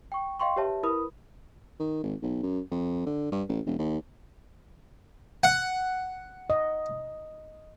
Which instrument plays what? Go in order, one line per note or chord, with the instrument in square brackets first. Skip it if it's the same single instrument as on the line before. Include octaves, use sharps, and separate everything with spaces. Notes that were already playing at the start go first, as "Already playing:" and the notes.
[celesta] G5 C#6
D#5 F5 G5 C6 C#6
G4 B4 C#5 E5 A5
E4 A#4 B4 B5 D#6
[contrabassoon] D#3
G#1
B1
F#2
F2
D3
G2
A1
E1
D#2
[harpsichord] F#5
[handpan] D#5